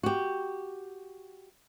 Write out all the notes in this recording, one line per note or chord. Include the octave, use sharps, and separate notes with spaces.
F#4 G4